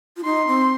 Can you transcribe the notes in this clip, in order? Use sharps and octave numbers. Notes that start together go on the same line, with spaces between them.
F4
D#4 C6
C4